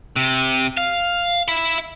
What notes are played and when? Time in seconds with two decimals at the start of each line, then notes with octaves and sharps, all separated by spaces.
0.16 C3
0.77 F5
1.48 E5 B5